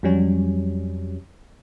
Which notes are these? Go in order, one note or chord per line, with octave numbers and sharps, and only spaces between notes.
F2 F#3 G3 C#4